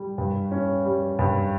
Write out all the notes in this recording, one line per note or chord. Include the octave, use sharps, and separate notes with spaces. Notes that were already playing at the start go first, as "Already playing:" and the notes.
Already playing: G3
G2
C#4
G3
G2